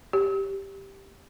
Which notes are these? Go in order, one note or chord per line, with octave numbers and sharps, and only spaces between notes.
G4